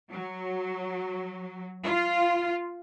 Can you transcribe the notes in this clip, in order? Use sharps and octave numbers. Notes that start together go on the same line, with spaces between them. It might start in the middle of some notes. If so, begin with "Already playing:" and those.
F#3
F4